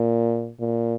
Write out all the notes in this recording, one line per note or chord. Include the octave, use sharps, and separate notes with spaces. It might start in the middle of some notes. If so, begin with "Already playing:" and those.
Already playing: A#2
A#2